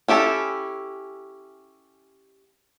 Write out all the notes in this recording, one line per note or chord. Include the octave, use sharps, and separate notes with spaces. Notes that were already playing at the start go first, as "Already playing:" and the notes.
C#4 E4 G4 A4